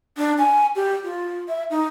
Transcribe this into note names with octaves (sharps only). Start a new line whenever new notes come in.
D4
G#5
G4
F4
E5
D#4